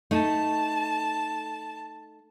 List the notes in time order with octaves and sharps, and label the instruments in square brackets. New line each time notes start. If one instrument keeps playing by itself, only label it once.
[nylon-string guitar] A3 D#4 [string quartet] A5